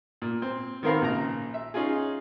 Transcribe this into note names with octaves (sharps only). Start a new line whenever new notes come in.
A#2
C4
D#3 B3 C4 A#4 F5 B5
A#1 C#3 A#5
E5
C#4 D#4 F4 G#4